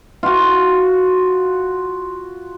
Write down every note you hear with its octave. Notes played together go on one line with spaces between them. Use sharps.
F4 F#4